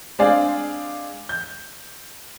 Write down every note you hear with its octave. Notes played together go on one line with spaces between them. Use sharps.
G#3 C4 D4 G#4 D5 F5
G6